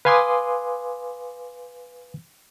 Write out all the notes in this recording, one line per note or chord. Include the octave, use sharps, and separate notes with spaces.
B4 F5 G#5 C6 D6 D#6